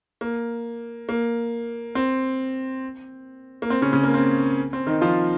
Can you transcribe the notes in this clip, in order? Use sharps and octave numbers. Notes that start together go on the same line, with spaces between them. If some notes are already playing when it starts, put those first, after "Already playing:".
A#3
A#3
C4
A#3
C4
C#3 C#4
C#3 C#4
A#3
C4
C4
D#3 D#4
F3 F4